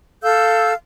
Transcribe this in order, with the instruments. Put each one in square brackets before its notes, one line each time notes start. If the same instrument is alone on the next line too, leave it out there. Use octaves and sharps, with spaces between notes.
[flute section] A4 F5 E6 G6